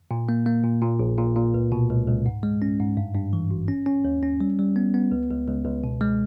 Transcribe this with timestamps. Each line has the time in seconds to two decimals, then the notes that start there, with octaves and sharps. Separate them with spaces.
0.11 A#2
0.29 A#3
0.46 A#3
0.64 A#2
0.82 A#2
0.99 A#1
1.18 A#2
1.36 A#2
1.54 C#2
1.72 B2
1.90 C#2
2.07 C#2
2.26 G#2
2.43 G#3
2.62 C#4
2.79 G#2
2.97 G2
3.15 G2
3.33 E3
3.51 G#1
3.68 C#4
3.86 C#4
4.05 D#2
4.23 C#4
4.41 G3
4.59 G3
4.76 B3
4.94 B3
5.12 C#2
5.30 C#2
5.47 C#2
5.65 C#2
5.84 B2
6.01 G#3